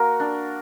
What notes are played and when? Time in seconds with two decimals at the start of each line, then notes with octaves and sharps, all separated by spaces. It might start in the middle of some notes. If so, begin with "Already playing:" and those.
Already playing: A#3 F#4 A#4
0.20 D4